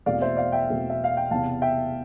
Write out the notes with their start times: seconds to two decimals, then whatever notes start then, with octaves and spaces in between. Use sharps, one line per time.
0.06 E2 B2 A3 C4 D5 F5
0.22 C5 E5
0.37 D5 F5
0.52 E5 G5
0.68 E2 B2 A3 C4
0.90 E5
1.04 F5
1.17 G5
1.31 E2 C3 E3 B3 F5 A5
1.62 E5 G5